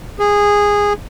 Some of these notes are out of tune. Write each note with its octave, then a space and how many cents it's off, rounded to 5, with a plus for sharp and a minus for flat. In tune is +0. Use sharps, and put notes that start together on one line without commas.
G#4 -15